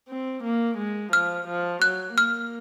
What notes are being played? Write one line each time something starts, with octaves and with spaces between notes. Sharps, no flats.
C4
A#3
G#3
F3 F6
F3
F#3 F#6
A#3 F6